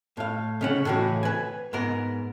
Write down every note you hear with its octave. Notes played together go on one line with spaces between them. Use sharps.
A2 F5
C#3 C#4 F#5
A2 C#3 E3 C#4 F#4
B4 G#5
G#2 B3 A#4